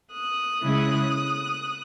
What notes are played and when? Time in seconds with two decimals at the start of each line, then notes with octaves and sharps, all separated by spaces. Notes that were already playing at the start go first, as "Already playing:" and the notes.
0.13 D#6 F#6
0.62 C#3 G#3 C#4 E4